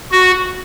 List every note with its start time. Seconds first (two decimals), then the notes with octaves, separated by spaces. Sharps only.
0.12 F#4